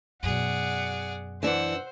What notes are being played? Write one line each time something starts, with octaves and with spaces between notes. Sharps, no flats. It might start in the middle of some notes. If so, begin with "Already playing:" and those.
F#2 B2 G#4 D5 F#5
E3 D4 C5 F#5 E6